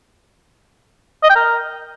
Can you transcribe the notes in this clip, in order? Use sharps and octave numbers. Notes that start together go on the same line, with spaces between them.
D#5
G5
A#4